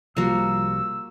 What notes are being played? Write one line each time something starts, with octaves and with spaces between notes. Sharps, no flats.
C2 F3 G3 A#3 F#4 E6